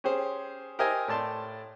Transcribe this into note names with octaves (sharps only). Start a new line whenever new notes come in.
C#4 G4 G#4 C5
G4 A#4 C5 D#5 E5 G#5
A2 D5 A5 C6